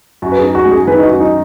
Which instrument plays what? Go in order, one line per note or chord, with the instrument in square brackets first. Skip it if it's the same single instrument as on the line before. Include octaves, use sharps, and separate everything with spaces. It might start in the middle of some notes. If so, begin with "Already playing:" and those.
[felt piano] F#2 [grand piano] F#4
[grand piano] B4
G#4
[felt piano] D#4
[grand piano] F#4
[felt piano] G#3
[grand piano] G#4
[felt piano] D#3 [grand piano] B4
[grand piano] D#4
F#4
[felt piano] F#2
[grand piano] D#4